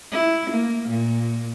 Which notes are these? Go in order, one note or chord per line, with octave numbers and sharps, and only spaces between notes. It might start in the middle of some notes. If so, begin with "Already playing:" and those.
E4
A#3
A#2